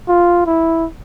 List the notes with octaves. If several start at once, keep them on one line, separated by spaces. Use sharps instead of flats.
F4
E4